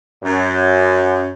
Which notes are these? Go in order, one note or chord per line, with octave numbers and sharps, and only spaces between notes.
F#2